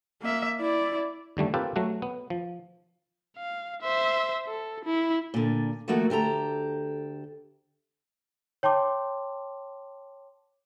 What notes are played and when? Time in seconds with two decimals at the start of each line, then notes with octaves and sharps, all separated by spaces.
0.22 A#3 E5
0.60 E4 D5
1.37 D#2 D3 G3 A3
1.54 A#3 C4 F4 G4 A4 B4
1.76 F#3 A3 F#4
2.02 B3
2.30 F3
3.37 F5
3.81 C5 E5
4.48 A4
4.85 E4
5.34 A#2 D3
5.88 D#3 F3 A3 A#3 F#4
6.10 D2 G4 A4 A#5
8.63 C#5 G5 A5 C6 D6